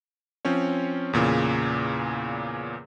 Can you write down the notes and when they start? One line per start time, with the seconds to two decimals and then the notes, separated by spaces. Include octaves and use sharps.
0.45 F3 C4 C#4 C#5
1.13 E2 A#2 C#3